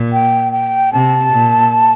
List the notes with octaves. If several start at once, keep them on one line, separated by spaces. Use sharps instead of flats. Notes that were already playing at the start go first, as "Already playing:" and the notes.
Already playing: A#2
G5
G5
C3 A5
A#2